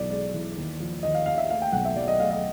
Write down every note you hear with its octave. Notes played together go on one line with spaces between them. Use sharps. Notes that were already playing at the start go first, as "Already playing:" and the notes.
Already playing: B1 E3 D5
G#3 D5
E3
D#2
F3
D#2 D#5
F5
D#2 F5
E5
A3 F5
G5
B1 F#5
E5
F#3 D5
D#5
A3 F5
D#5